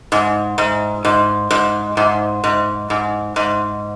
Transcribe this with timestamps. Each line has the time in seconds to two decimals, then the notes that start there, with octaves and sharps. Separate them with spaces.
0.12 G#2
0.58 G#2
1.05 G#2
1.51 G#2
1.97 G#2
2.44 G#2
2.90 G#2
3.36 G#2